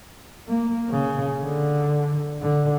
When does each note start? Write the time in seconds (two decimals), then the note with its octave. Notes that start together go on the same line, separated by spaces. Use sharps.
0.48 A#3
0.90 C#3
1.42 D3
2.42 D3